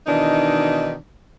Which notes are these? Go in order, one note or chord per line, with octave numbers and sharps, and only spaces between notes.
B2 D#3 E3 D4 D#4